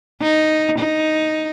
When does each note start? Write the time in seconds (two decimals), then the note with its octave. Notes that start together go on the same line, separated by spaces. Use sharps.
0.22 D#4
0.79 D#4